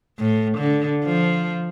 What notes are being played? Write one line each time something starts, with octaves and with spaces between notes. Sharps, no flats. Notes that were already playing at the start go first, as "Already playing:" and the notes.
A2
D3
F3